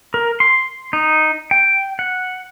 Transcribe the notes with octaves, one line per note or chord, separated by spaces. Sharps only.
A#4
C6
D#4
G5
F#5